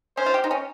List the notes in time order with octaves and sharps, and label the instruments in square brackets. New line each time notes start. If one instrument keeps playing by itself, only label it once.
[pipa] C#4 [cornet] C5
[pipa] F4
G4
D#4
C#4